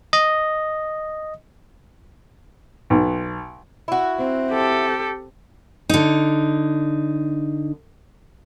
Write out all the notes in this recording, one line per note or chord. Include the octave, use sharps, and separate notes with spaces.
D#5
B1
E4 F#4
C4
G4 A4
D3 D#4